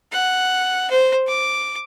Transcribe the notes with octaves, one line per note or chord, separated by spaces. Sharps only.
F#5
C5
D6